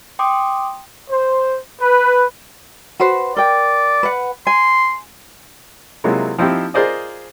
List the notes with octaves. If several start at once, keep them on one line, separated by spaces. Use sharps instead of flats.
G5 C6 D6 D#6
C5
B4
F#4 B4 C5
A#4 D5 G5
B4 F#5
G#5 C6
C3 F#3 G#3 A#3 E4 F4
F3 C4 D#4 E4 G4
F4 G#4 A#4 C5 D5 D#5